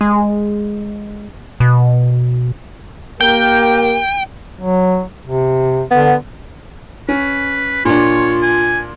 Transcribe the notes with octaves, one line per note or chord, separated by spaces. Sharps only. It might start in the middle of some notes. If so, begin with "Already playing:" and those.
G#3
B2
A#3 G4 A#4 G5 G6
F#3
C3
D3 B3
C#4 B4
A#2 D4 F4 C#5
G#5